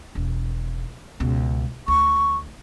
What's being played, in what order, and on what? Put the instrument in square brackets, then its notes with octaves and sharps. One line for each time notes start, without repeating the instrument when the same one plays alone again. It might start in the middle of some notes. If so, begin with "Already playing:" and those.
[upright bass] E1
C#2 B2
[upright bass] D2 [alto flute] C#6